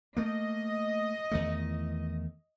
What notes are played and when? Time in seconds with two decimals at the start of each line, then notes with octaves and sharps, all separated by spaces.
0.17 A3 A#3 D#5
1.31 E2 D#3 A3